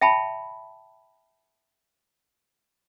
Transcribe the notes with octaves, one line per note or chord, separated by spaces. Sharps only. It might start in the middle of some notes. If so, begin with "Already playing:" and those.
E5 G5 A5 B5